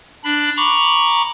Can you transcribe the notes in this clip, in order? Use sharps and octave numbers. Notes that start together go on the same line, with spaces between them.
D4 B5
A#5 B5 C#6 D6